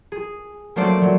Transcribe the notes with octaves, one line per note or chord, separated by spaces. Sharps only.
G#4
F#3 A3 A#3 D4 C5 D5
F#3